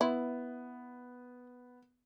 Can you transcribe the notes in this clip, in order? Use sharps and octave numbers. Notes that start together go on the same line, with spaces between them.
B3 E4